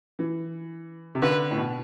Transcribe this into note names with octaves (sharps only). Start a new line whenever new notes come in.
E3
C3
D3 B4
A2
B2